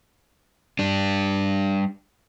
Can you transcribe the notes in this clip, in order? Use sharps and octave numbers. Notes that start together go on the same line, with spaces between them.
G3 D4